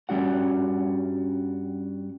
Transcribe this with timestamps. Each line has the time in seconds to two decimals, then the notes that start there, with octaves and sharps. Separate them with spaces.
0.09 G2 G3 C#4 F#4 F#5